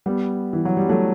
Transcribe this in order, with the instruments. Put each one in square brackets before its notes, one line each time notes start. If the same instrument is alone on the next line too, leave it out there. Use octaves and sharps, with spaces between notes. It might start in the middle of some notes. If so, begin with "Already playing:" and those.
[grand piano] G3 B3
E3
F#3
G3
F#3 A3